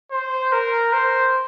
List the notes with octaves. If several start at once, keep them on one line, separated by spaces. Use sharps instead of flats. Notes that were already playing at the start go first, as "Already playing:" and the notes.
C5
A#4
C5